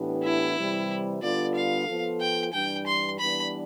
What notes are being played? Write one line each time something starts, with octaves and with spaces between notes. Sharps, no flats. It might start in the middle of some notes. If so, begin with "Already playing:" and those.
Already playing: A2 E3 B3 D4 G4
E4
C3 E3 G3
D3 G3 B3 F4 D5
F5
F3 B3 F4 A4
G5
G2 E3 G3 D4 G5
C6
E3 G3 B3 D4 B5